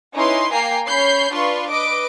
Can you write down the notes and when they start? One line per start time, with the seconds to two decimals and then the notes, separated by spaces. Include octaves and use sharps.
0.15 C#4 D#4 E4 B4 C6
0.52 A#3 G5 G#5 A#5 C7
0.86 C#4 C#5 B5 G6 C7
1.32 D4 F4 B4 C6 C#6
1.70 B4 D#5 D6 D7